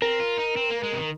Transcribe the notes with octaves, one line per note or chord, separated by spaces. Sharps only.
C4 A#4
F4
D#4
C4
A#3
G#3
C3
D#3